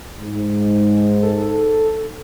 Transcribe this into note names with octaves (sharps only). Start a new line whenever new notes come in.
G#2
A4